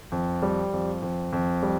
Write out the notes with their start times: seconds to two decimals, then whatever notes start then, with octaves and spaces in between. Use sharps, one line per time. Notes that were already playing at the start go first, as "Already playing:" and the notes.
0.12 F2
0.42 G3
0.73 F2
1.02 F2
1.33 F2
1.63 G3